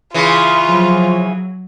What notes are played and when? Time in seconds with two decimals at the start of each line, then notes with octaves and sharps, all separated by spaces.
0.14 C#3 E3 F4
0.69 F3 F#3